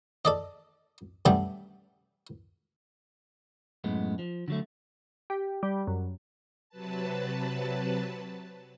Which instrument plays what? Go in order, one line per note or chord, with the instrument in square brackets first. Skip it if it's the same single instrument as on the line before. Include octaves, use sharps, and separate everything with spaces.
[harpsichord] A4 D5 D#5
G3 A3 B3 C#4 G4 A4
[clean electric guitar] F#2 A2 G#3 B3
F3
D3 F#3 A3
[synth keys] G4
G3
F#2
[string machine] C3 F#3 B4 A5